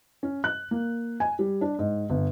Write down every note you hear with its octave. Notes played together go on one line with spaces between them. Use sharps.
C#4
F#6
A#3
G#5
G3
D4
G#2
G1